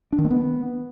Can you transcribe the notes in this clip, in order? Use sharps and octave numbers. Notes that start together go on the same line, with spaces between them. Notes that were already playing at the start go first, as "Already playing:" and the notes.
D4
D#3
A#3
B3